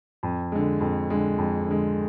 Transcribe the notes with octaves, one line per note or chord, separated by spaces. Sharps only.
F2
D3 G#3
F2
D3 G#3
F2
D3 G#3